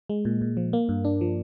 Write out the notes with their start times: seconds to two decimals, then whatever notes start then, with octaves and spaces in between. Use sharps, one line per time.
0.09 G#3
0.25 A#2
0.41 A#2
0.57 F3
0.73 A#3
0.89 G2
1.05 D4
1.21 F3